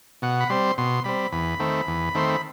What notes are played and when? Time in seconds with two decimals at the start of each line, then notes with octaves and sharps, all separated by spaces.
0.22 B2 F#5
0.41 B5
0.50 G3 C4 C6
0.78 B2 C6
1.04 G3 C4 B5
1.32 E2 B5
1.59 D#3 A3 C4
1.87 E2
2.15 D#3 A3 C4 C6
2.29 B5